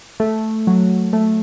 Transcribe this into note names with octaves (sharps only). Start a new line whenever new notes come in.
A3
F#3
A3